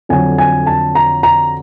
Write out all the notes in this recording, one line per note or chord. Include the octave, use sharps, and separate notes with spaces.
F2 D3 F#3 G#5
G#5
A5
A#5
A#5